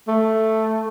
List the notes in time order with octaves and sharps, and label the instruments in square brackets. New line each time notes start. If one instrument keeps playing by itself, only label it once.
[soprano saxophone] A3